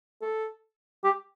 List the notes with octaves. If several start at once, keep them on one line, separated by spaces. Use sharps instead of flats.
A4
G4